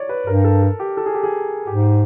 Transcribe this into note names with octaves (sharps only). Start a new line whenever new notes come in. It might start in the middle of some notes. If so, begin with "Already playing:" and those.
Already playing: C#5 D5
B4
G2 A#4
A4
A4
G4
A4
G#4
G4
G#4
G#2 G4